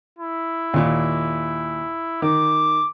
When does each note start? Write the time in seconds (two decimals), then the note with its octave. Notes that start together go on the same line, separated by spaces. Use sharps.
0.19 E4
0.74 D#2 A#2
2.22 D#3 D6